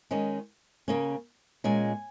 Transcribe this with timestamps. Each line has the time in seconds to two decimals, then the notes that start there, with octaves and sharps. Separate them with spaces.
0.11 D#3 G#3 C#4
0.88 C#3 A#3 C#4
1.64 A#2 G#3 C#4 G#5